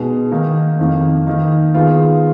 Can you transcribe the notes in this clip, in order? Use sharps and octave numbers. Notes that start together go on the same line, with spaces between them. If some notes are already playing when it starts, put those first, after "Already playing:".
Already playing: B2 G#3 B3 D#4
D#3 A#3 D#4
F2 D#3 A#3
D#3 A#3 D#4
D#3 G#3 B3 F4